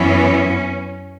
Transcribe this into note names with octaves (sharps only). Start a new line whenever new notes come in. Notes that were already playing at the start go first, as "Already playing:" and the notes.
Already playing: F#2 E3 B3 C#4